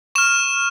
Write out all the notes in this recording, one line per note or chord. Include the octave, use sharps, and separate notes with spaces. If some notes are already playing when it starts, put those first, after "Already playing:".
C#6 F6 E7